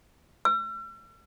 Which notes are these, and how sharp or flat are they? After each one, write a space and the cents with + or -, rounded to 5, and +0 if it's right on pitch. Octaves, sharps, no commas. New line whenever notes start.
E6 +45